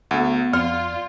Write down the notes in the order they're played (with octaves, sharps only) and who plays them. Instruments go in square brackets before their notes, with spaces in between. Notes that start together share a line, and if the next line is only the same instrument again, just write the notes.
[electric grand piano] D2 [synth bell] B3 F#5
[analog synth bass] F2 [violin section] F4 [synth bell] D5 [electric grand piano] F6